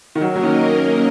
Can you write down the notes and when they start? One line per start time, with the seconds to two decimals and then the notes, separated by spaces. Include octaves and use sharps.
0.15 D#3
0.21 F#3 A#3 C#4 A#4 D#5
0.36 F#3
0.43 D#3